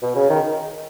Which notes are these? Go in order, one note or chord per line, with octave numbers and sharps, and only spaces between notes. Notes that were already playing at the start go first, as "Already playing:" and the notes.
B2
C#3
D#3